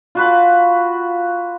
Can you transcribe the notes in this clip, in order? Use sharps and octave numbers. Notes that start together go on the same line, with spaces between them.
F4 F#4 B4